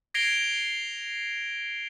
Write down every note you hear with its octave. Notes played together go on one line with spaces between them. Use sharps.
G#6 A#6 C7 D7 F7 G7